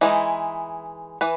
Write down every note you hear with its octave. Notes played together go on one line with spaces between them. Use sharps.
E3 G#3 D#4 E4
E3 B4